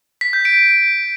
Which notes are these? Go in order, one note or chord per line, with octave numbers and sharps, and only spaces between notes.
B6
G6
D7